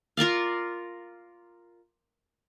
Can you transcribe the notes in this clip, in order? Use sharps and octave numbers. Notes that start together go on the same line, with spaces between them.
F4 A#4 D5 F5